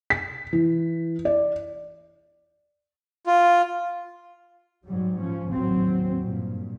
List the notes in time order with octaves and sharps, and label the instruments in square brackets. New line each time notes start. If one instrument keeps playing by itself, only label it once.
[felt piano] B6
E3
D5
[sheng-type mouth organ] F4
[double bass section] G#2 F#3 G3
F3 C#4
A1 D#2 F#3 C4
G2 A#2